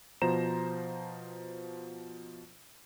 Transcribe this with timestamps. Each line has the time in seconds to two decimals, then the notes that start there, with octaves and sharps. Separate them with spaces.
0.22 B2 F3 C5 A#5 E7